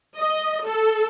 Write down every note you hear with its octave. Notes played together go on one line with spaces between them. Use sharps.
D#5
A4